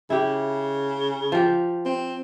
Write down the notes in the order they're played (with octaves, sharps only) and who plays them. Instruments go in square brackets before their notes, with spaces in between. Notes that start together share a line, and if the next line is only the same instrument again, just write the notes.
[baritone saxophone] C#3 [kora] E4 G4
[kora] F3 G4
[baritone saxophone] C4